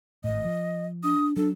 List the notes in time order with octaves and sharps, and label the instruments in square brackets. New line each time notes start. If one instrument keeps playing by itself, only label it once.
[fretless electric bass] G#1 A2 [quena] D#5
[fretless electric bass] F3
[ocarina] D4 [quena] D#6
[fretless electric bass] F#3 [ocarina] D4 [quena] A4